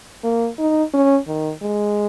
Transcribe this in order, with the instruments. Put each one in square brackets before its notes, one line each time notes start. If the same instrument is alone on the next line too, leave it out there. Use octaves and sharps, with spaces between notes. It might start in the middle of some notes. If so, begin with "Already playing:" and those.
[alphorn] A#3
D#4
C#4
D#3
G#3